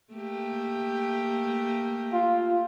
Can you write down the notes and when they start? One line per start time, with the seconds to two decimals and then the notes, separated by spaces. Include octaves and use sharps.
0.13 A3 A#3 G4
2.13 F4